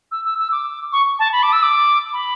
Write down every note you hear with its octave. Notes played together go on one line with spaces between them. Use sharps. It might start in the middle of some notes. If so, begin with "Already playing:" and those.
E6
E6
E6
D6
C#6
A5
B5
D6
E6
D6
B5